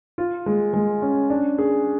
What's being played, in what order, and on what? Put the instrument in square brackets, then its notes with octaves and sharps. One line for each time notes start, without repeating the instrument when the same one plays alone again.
[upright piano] F4
G#3
G#3
C#4
D4
G#4